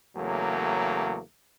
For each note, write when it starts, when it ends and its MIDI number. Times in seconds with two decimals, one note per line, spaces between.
0.17 1.21 40
0.17 1.21 49
0.17 1.21 54
0.17 1.21 57
0.17 1.21 58